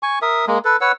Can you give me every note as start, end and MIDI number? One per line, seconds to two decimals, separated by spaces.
0.03 0.19 80
0.03 0.19 85
0.22 0.45 70
0.22 0.45 76
0.22 0.45 87
0.47 0.58 56
0.47 0.58 58
0.65 0.77 69
0.65 0.77 71
0.81 0.92 71
0.81 0.92 73
0.81 0.92 78
0.81 0.92 88